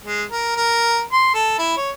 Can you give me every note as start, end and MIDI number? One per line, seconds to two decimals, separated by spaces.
0.04 0.23 56
0.31 0.52 70
0.56 1.01 70
1.12 1.31 84
1.34 1.55 69
1.58 1.73 64
1.77 1.91 73